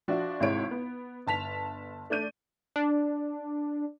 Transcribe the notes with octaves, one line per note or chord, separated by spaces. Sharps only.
F3 D4 F#4 E5
G#1 C3 G#3 E4 C#5 D7
B3
G1 A5 B6 F7
A3 D4 D5 G6 D#7
D4